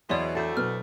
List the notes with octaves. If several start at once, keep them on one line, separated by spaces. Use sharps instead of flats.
E2 B2 F#3 E4 G#4 D5 C6
D2 A3 A4 C5
B2 F#3 B3 F6